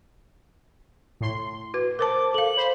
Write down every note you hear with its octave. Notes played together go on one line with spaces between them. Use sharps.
A2 C6
F#4 B4
A#4 C5 A5 D6
A4 F5 F#7
C5 B5